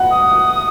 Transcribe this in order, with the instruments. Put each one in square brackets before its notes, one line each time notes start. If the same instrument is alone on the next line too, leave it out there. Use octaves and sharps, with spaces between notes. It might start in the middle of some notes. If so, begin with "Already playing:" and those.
Already playing: [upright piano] F#5
[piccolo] D#6